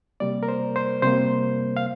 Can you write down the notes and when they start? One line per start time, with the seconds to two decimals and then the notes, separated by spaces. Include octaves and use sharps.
0.20 C3 G3 A#3 D5
0.43 A#4
0.48 C5
0.76 C5
1.02 C3 G3 A#3 C5
1.77 F5